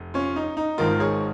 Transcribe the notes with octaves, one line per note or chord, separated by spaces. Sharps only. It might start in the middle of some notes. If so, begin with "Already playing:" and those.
Already playing: F1
C#4 F4
D#4
D#4
G#1 G#2 D#3 F4 A#4
G#4 C#5